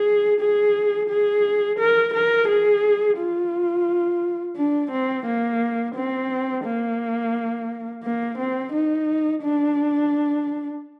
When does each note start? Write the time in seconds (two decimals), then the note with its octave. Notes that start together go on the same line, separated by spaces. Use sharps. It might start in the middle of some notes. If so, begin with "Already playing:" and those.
Already playing: G#4
0.41 G#4
1.10 G#4
1.79 A#4
2.14 A#4
2.49 G#4
3.18 F4
4.57 D4
4.91 C4
5.26 A#3
5.95 C4
6.65 A#3
8.04 A#3
8.38 C4
8.73 D#4
9.43 D4